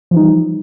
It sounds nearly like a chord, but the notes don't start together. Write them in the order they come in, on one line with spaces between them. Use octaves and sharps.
F3 E3 D#4 G3